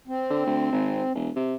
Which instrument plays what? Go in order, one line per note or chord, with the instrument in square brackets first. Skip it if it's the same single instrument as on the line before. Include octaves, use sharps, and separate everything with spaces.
[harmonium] C4
[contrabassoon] D3
D2
G#1
E1
C3